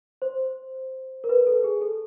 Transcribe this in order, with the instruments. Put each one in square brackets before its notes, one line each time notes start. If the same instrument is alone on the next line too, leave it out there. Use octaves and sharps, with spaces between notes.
[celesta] C5
A#4
B4
A4
G#4
A4